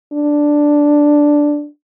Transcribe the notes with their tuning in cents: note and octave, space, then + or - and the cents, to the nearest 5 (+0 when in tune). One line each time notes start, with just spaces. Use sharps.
D4 +0